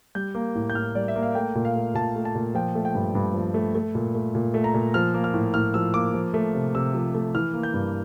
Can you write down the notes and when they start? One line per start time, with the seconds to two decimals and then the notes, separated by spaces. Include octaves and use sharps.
0.15 G3 G6
0.35 A#3
0.55 A2
0.70 G6
0.75 A2 F6
0.95 G3 D5
1.08 E5
1.16 A#3
1.23 F5
1.35 A3 G5
1.55 A#2
1.65 F5
1.75 A3
1.94 A#2 A5
2.16 A3
2.25 A5
2.35 A#2
2.55 F3 G5
2.75 A3
2.85 G5
2.95 G2
3.15 G2
3.34 F3
3.54 A3
3.75 A3
3.95 A#2
4.15 A3
4.35 A#2
4.54 A3
4.64 A#5
4.74 A#2
4.94 F3 F6
5.14 A#3
5.24 F6
5.34 A2
5.54 A2 F6
5.74 F3 E6
5.94 A#3 D6
6.14 F3
6.34 A3
6.55 C3
6.75 C3 E6
6.94 F3
7.15 A3
7.35 E3 F6
7.53 A#3
7.63 G6
7.74 G2